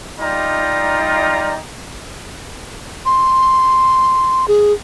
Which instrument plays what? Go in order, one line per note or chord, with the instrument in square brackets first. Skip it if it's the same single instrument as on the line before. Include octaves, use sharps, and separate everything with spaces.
[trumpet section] G3 D#4 F4 D5 D#5 A#5
[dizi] C6
G#4